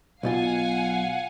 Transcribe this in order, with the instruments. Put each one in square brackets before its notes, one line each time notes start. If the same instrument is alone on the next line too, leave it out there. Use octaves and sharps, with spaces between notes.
[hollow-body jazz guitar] B1 B2 F4 [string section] F5 F#5 G#5